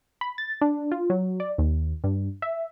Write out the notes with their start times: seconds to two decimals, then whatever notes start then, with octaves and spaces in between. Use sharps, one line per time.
0.21 B5
0.38 A6
0.61 D4
0.92 F4
1.10 F#3
1.40 D5
1.58 D#2
2.04 G2
2.42 E5